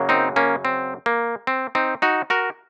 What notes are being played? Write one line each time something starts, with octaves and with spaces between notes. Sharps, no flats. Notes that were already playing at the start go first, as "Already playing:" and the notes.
Already playing: F#2 C#3 F#3 A#3
C4 D#4
A#3 C#4
C4
A#3
C4
C4 D#4
D#4 F#4
F#4 A#4